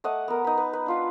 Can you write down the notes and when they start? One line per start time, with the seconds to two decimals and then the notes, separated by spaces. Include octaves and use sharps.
0.04 A3 D#5 F#5 D6
0.28 B3 A#4
0.44 D#4 B4
0.58 B4
0.73 B4
0.86 D4 F4 B4